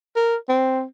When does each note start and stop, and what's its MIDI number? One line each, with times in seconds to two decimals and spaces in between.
0.16 0.36 70
0.49 0.83 60